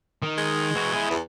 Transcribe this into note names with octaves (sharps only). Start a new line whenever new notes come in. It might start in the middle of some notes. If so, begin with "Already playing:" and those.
D#3
G#3
E3 F#4
E4 G#4
E2